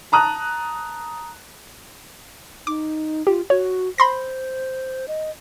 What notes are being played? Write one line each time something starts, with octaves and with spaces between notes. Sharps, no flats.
A5 A#5 D#6 F#6
D#4 D6
F4 G4
F#4 C#5
C5 B5 C6 A#6
D#5